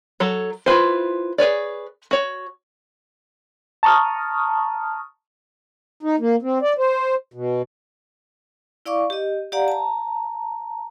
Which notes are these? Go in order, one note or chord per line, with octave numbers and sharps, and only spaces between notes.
F#3 A4 C#5
E4 F4 B4 C5
G#4 B4 C#5 D5
F#4 C#5
A5 A#5 C#6 D#6 F6
D#4
A#3
C4
D5
C5
B2
E4 D5 F5 C#6 D6
G4 D#5
G4 D5 F5 F#5 A#5
A5 A#5